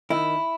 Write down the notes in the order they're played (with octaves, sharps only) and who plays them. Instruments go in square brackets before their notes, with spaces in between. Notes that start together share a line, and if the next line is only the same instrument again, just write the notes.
[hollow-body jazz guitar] D#3 E4